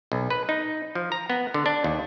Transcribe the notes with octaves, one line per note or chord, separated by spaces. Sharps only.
B1
B4
D#4
F3
A#5
B3
D3
D4
D#2